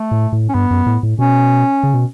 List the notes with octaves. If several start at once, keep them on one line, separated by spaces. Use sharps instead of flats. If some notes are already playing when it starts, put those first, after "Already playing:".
Already playing: A3
A2
A2
C#4
G2 B3
F#2
A2
A2
B2 C#4
C#3
B2